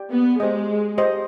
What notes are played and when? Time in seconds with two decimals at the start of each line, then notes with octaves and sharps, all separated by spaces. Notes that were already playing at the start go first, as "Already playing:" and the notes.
Already playing: G4 D5 G5
0.11 B3
0.40 G#3 G4 C5 D#5
0.98 G4 C5 D#5